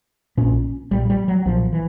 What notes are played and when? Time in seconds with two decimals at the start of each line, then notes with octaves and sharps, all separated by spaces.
0.37 A#1 A#2 C#4
0.91 B1 A#2 G3
1.10 G3
1.28 F#3
1.46 B1 A#2 F3
1.73 E3